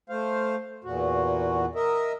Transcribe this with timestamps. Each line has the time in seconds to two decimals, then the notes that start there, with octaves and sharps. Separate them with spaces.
0.10 A3 C5 F5
0.84 E2 A#2 F#4
1.75 A#4 D#5 E5